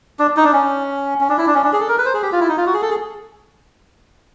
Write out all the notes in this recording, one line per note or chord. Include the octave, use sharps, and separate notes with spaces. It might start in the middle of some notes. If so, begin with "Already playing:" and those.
D4
D#4
D4
C#4
C#4
D4
E4
D4
C#4
D4
G#4
A4
A#4
B4
C5
G#4
G4
F4
E4
D#4
F4
F#4
G#4
A4
G#4